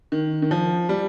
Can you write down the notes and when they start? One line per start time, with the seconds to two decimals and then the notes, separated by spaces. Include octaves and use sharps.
0.12 D#3
0.42 D#3
0.51 F3
0.89 G3